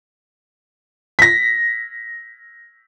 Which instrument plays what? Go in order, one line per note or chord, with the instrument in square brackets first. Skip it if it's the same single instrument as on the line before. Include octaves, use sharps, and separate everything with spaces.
[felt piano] A#6 B6